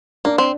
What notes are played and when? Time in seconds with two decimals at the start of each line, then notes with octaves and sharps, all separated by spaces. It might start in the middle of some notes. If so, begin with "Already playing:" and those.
0.25 A#3 D4
0.38 C4